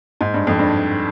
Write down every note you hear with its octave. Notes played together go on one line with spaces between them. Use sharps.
G#2
G2
F2
G2